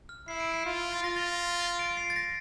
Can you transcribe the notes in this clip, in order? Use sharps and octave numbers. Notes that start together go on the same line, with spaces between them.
F6
E4 C7
D7
C7
F4
A6
F4 A#6
A6
D7
C7
A6
A#6